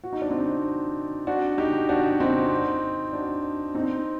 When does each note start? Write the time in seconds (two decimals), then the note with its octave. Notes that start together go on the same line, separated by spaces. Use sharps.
0.04 F#4
0.13 D#4
0.22 D4
0.31 C4 D#4
1.27 D4 F#4
1.58 D#4 G4
1.89 D4 F#4
2.20 C4 D#4
3.13 D4 F#4
3.75 C4 D#4